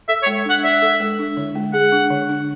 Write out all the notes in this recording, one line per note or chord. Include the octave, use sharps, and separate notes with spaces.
A4 E5
C#5
G#3
D4 F#5
D5 E5
A4
G#3
D4
D3
G#3
G#4 F#5
D4
D3
D4